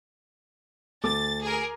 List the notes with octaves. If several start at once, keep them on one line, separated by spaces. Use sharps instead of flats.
D2 A4 D6 A6
G#4 A#4